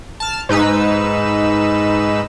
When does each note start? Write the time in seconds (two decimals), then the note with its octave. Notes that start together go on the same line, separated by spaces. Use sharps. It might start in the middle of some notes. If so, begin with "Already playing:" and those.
0.20 A5 F6
0.49 G#2 D#4 B4 E6